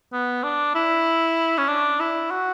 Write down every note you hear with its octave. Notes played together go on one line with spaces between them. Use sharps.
B3
D4
E4
C#4
D4
E4
F#4